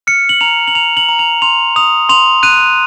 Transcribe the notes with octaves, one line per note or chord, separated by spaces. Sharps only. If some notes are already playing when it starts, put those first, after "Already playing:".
F6 C#7
F#7
A#5 F7
F#7
A#5 F7
F#7
A#5
F7
C6 F7
D#6 F7
C6 F7
F#6 D#7